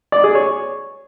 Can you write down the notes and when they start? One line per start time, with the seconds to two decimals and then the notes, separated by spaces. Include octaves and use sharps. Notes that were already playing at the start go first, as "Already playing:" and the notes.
0.12 D5
0.24 G#4
0.35 C#5